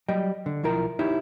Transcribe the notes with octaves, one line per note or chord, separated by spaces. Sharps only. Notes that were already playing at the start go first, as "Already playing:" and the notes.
F#3 G3 D#5 G5
D3
B1 F3 E4 A#4 G5 A#5
D#4 E4 G4 C#5